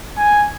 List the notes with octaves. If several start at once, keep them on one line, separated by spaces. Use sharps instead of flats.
G#5